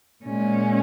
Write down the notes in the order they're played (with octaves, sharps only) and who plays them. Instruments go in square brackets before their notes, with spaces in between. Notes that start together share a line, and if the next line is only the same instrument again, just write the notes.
[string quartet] A#2 G#3 C#4